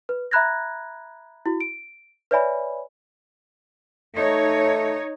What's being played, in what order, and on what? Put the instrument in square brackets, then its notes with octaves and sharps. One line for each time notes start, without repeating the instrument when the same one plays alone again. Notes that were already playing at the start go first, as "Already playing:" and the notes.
[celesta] B4
E5 A#5 B5 F#6 G#6 A#6
E4 F#4
D7
B4 C#5 D5 E5 G#5 B5
[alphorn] A3 [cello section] D#4 C#5